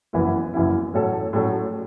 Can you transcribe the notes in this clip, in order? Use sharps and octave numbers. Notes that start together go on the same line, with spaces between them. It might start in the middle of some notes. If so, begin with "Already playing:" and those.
F#1 F#2 E3 B3 E4
F#1 F#2 E3 B3 E4
A2 F#3 C#4 F#4 A4
A2 F#3 C#4 F#4 A4